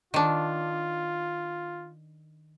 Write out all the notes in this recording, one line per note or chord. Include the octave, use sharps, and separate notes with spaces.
D#3 D4 F4